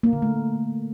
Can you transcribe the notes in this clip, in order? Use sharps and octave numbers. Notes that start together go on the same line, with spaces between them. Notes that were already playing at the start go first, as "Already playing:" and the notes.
A#3
D3
A3